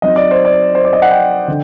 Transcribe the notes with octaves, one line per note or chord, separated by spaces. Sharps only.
F#3 C4 D#4 D#5
D5
C5
D5
C5
D5
D#5
F#5
G5
D3